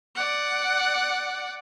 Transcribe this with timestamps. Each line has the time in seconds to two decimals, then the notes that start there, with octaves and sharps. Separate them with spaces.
0.15 D5 F#5